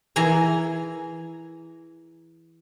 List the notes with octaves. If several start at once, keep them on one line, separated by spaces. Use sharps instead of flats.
E3 G#4 G#5 A#5